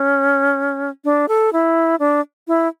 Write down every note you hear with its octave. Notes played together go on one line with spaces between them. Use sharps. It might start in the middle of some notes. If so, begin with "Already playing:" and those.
Already playing: C#4
D4
A4
E4
D4
E4